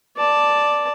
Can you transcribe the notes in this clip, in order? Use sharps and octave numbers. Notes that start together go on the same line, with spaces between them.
D5 A5